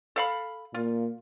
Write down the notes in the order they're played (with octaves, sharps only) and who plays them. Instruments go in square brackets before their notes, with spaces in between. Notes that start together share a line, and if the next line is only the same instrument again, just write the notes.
[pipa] A4 F5 B5
[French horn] A#2 [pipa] F4